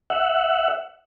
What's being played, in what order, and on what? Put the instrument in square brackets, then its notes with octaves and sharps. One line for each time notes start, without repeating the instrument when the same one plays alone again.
[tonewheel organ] E5 F#5